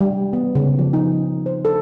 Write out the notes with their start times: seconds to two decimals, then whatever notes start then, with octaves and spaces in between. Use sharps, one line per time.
0.01 G3
0.33 B3
0.55 C#3
0.79 F3
0.93 D#4
1.46 C5
1.65 A4